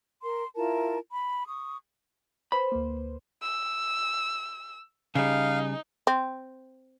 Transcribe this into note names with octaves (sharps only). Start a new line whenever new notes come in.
A#4 C6
E4 F4 A#4 A5
B5
C#6 D#6
B4 C5 B5
D2 A#3
E6
C#3 G3 D#4 F5
C4